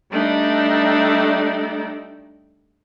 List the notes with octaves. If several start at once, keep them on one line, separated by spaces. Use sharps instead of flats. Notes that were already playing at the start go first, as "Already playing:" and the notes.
G3 A3 D4 D#4